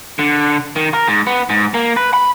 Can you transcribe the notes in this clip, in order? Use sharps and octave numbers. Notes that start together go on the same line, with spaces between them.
D3
D#3
A#4
G#2
B3
G#2
A#3
B4
B5